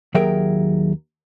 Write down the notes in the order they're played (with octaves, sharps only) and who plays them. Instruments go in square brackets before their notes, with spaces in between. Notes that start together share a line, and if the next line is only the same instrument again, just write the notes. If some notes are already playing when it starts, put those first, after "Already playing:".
[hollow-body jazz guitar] D#2 F#3 G#4 A#4 E5 G5